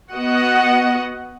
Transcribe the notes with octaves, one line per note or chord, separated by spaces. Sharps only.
B3 F#4 D#5 F#5